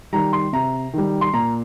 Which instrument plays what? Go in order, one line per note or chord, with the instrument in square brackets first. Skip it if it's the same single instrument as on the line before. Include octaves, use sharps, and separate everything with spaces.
[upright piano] D#3 G3 A#5
C6
C3 A#5
D#3 G3
C6
A#2 A#5